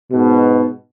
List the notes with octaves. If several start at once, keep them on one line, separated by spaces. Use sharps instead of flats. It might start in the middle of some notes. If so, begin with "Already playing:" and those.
G#2 B2